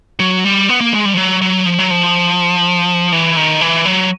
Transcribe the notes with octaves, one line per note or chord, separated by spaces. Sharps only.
F#3
G3
B3
A#3
G#3
G3
F3
F#3
F#3
F3
F#3
F3
E3
D#3
E3
F#3